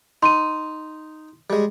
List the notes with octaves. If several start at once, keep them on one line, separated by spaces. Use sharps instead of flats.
D#4 C6 D#7
G3 G#3